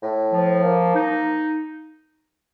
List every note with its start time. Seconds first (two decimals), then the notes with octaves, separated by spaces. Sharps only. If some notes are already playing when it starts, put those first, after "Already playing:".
0.03 A2
0.33 F3
0.63 A#3
0.94 D#4